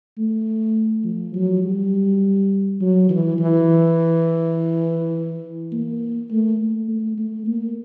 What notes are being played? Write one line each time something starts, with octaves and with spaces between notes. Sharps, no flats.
A3
F3
F#3
G3
F#3
E3
E3
A#3
A3
A3
A3
A#3